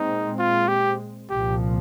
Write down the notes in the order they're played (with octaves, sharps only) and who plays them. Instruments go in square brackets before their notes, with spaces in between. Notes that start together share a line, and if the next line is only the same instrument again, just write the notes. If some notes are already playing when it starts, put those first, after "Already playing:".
Already playing: [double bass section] A#2 G#3 C4 [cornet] D#4
[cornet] F4
G4
[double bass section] C2 A#2 F3 [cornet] G4